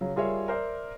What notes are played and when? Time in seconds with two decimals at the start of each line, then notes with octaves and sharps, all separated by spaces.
0.01 C#3 F#3
0.16 G3 F4 G#4 A#4 C#5 E5
0.48 A#4 C5 D5 E5